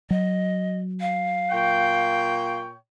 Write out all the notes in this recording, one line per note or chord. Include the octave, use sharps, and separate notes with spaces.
F#3 D#5
F5
A#2 C#5 G5